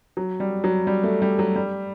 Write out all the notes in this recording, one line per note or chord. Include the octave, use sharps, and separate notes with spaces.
F#3
G3
F#3
G3
A3
G3
F#3
G3